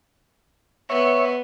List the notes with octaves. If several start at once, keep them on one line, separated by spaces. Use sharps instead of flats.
B3 C#5 E5 C#6